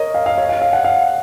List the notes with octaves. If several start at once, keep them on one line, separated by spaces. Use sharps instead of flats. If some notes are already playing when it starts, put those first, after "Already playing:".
Already playing: A#4 C#5 D#5
F5
F5
C#5
F5
F5
F#5
F5